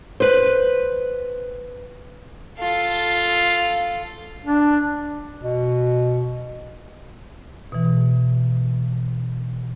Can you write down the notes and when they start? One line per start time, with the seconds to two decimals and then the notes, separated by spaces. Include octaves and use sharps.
0.20 B4 C5
2.59 F4 A4
4.45 D4
5.42 B2
7.72 B2 E3